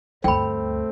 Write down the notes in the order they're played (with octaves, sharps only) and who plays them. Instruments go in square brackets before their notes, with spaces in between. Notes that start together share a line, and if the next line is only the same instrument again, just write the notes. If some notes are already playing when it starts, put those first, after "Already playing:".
[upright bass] D2 G2 [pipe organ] A3 C4 [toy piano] G5 B5